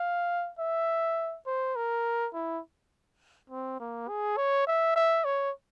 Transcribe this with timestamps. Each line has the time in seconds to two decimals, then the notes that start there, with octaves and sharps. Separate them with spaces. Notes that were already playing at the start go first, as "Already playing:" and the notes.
Already playing: F5
0.59 E5
1.46 C5
1.76 A#4
2.34 E4
3.50 C4
3.80 A#3
4.08 G#4
4.37 C#5
4.67 E5
4.96 E5
5.25 C#5